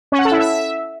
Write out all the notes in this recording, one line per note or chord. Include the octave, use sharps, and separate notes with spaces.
C#4
F#5
A4
E4
E5